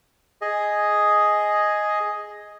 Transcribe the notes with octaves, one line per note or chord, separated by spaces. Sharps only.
G#4 D#5